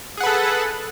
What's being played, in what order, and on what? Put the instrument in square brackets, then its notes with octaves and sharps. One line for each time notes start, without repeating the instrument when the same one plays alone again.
[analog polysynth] G#4
F#5
B4
A4